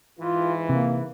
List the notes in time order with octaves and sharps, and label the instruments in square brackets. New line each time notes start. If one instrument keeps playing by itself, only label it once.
[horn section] G#2 E3 [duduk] F4
[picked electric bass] C3 [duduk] A#3